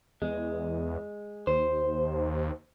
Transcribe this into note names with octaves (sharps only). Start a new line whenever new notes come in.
E2 G#3
D#2 C5